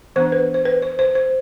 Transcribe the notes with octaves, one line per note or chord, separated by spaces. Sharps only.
E3 B3 D4 C5
B4
C5
B4
C5
C5
C5